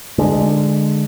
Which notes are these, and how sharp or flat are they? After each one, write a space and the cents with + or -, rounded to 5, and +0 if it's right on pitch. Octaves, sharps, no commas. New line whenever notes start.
D3 +10 G#3 +0